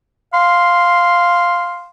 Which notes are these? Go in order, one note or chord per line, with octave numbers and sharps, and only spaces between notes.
F5 C6